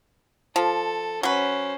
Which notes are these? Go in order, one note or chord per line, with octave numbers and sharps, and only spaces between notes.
F3 A4
F#3 C#4 B4 C5